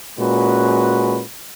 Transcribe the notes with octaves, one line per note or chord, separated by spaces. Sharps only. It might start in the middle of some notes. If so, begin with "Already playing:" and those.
A#2 G#3 C#4 F#4 B4